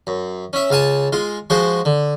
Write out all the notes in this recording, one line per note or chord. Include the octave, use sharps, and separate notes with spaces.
F#2
C#4 E5
C#2 F5 G#5 A5
G#3 F4
F3 G#3 F#4 C5
D3